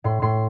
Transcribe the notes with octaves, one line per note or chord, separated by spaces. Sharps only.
A2 C6
A2 C6